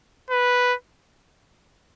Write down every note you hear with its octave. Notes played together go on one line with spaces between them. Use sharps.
B4